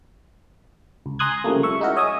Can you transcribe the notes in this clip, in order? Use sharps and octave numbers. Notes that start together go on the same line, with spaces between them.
C#2
G#5 A#5 C6 D#6 F#6 G#6
C#3 F3 G3 A3 A#3
E5 C#6
G#3 D#4 E4 F#4 A#4
C#5 D#5 E5 G#5 D#6